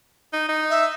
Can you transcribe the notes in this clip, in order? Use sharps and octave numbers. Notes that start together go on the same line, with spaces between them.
D#4
D#4
E5